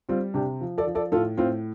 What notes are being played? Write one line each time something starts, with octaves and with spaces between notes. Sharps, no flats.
G3 C4 F4
C3 D4 G4
F3
A4 D5
F3
A4 D5
A2 F4 A4
A2 C4 F4